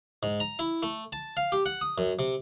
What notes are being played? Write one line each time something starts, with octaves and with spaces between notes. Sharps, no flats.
G#2
A#5
E4
A3
A5
F5
G4
F#5
D#6
F#2
C3